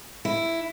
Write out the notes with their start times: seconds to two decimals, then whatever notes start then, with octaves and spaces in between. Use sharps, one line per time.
0.25 E4